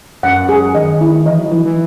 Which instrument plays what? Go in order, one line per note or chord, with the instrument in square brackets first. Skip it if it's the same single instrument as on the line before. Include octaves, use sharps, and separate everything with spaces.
[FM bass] F#2 [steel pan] F#5
[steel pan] G#4
[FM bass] D#3 [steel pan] D#5
[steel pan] E4
[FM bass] E3 [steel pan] D#5
[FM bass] F#3
[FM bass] E3 [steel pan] E4
[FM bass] E3